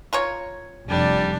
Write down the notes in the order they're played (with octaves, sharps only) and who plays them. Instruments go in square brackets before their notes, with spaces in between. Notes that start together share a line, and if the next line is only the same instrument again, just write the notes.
[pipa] F4 A#4 C#5
[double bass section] F1 [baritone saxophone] G3 [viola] D4